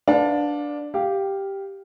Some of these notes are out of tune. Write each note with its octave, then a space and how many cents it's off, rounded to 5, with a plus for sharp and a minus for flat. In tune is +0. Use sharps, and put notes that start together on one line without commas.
D4 +0 B4 +0 F5 +35
G4 +0 F5 +0